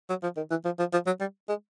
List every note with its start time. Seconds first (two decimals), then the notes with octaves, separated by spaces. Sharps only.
0.10 F#3
0.23 F3
0.37 D#3
0.51 E3
0.65 F3
0.79 F3
0.93 F3
1.07 F#3
1.20 G3
1.49 G#3